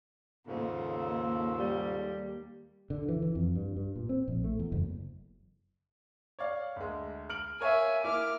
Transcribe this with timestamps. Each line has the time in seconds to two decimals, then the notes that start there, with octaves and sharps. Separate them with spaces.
0.47 D#2 G#2 C#3 A#3 F4 A4
1.59 G3
2.90 D3
3.09 E3
3.22 E3
3.35 F2
3.55 G2
3.76 G2
3.96 A#2
4.09 C4
4.28 A#1
4.44 A3
4.59 E2
4.72 F#1
6.39 C#5 D5 F5
6.76 D2 G#3
7.30 F6 D7 F#7
7.61 A#4 C#5 E5 F5 G#5
8.03 A#3 E4 D6 F6